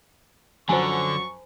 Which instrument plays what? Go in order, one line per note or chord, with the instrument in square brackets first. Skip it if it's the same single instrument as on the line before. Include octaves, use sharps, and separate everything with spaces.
[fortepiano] F#2 F3 F#3 [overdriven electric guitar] D3 [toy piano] C5 G#5 [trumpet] C#6